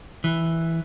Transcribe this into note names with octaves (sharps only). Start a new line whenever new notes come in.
E3